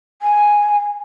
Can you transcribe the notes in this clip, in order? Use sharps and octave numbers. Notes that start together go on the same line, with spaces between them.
G#5